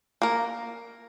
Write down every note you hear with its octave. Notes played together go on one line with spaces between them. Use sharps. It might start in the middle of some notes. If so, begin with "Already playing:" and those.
A#3 A#4